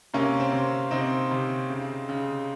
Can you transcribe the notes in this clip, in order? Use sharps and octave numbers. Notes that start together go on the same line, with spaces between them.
C3 A#3 C#4
C4
C3
C3 C4 D#4
C3
C#3
C#3